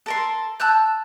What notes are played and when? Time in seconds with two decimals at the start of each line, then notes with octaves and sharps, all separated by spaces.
0.06 A4 A#4 C6
0.60 A5 E6 F#6 G6